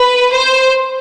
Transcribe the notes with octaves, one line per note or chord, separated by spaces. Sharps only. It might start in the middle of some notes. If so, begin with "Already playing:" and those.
Already playing: B4
C5